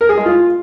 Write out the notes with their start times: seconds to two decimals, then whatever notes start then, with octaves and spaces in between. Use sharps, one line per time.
0.01 A#4
0.09 G#4
0.17 G#3
0.26 F4